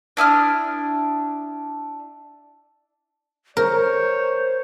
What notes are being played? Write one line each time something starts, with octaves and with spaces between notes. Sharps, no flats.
D4 E4 D#6 F6
A#4 C5 C#5